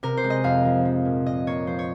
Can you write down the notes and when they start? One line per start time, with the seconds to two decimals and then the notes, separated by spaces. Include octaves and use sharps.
0.03 C3 A#4
0.17 C5
0.24 G#3
0.30 D#5
0.44 F2 F5
0.65 F3
0.85 F3
1.05 A#2
1.26 A#2 D#5
1.47 A#3 C#5
1.67 F3 C5
1.79 C#5